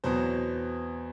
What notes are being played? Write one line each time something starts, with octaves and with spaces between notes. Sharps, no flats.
E2 B2 F#3 C5